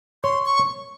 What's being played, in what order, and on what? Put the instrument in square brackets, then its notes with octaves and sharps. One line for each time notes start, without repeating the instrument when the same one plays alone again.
[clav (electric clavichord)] C#5 [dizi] C6
[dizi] C#6